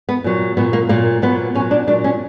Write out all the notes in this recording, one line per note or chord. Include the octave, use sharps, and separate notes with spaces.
B3
A#2 F#3
A#2 F#3 B3
A#3
A#2 F#3 A#3
A#2 F#3 B3
A#2 F#3 C#4
D4
A#2 F#3 D4
C#4